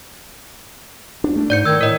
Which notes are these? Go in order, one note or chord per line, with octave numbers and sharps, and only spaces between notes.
D4
A3 D4
G#2 D5 G6 C#7
D#3 E6 G#6
A2 A#4 D#5